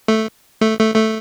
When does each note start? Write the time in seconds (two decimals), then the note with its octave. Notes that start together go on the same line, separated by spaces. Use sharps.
0.08 A3
0.61 A3
0.79 A3
0.96 A3